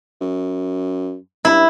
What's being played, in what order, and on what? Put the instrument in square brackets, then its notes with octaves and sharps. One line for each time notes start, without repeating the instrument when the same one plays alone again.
[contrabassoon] F#2
[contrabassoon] G2 [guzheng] E4